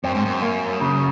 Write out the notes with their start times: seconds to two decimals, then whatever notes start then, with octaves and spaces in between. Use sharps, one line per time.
0.04 F#2 C4
0.14 G#2
0.25 F#2
0.42 A#3
0.81 C#3